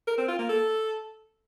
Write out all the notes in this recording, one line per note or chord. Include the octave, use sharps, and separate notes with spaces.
A#4
C4
F4
A#3
A4